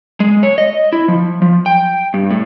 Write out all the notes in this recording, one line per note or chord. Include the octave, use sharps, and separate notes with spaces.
G#3
C#5
D#5
E4
F3
F3
G5
G2
A2